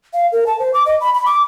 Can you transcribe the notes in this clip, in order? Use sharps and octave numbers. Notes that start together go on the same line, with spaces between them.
F5
A#4
A5
C5
D6
D#5
B5
B5
D6